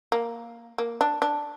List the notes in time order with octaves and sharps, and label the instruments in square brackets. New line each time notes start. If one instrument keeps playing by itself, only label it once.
[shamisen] A#3
A#3
D4
D4